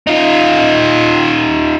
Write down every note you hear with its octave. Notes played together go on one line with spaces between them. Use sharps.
D#4 F4